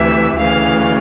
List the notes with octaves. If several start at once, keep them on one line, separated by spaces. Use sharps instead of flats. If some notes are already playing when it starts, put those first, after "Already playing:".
Already playing: D2 C3 E3 E5
D2 C#3 E3 F5